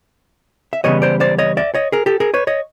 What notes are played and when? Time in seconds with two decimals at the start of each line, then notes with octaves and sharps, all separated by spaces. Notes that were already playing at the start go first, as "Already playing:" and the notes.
0.73 E5
0.84 C#3 E3 G3 B3 C#5 D#5
1.02 C5 D5
1.20 C5 D5
1.38 C#5 D#5
1.57 D5 E5
1.74 C#5 D#5
1.92 G#4 A#4
2.06 G4 A4
2.20 G#4 A#4
2.34 B4 C#5
2.47 C#5 D#5